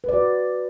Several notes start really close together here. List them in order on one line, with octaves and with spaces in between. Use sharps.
B4 D5 F#4